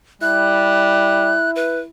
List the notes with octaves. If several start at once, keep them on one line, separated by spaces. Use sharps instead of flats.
G3 E4 F#6
B4